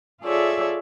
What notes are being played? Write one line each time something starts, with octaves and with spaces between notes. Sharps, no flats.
F4 G#4 A4 C#5 D5 E5